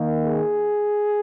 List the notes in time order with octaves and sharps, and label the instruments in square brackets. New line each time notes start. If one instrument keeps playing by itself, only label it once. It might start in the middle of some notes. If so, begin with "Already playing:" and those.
Already playing: [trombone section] D#3 A#3
G#4